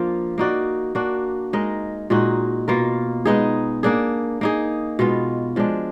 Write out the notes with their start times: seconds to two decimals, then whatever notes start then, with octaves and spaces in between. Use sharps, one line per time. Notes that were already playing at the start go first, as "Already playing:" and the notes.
Already playing: F3 A#3 D4 F4
0.38 A#3 D#4 F#4 D5
0.95 A#3 D4 F#4
1.53 G#3 D#4 A#4 D#5
2.10 A#2 G#3 D#4 F#4
2.68 B2 A#3 F4 A#4
3.25 G#3 B3 D#4 G#4
3.83 A#3 D4 G#4
4.41 A#3 D#4 G#4
4.99 B2 G#3 B3 F4
5.56 F3 G#3 D4